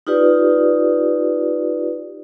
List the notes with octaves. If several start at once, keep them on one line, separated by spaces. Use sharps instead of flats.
D#4 F4 G4 B4 D5